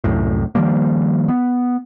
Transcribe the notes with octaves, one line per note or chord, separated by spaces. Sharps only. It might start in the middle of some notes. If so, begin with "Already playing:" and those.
C2 F#2 A2
D#3 F3 G3 A#3
B3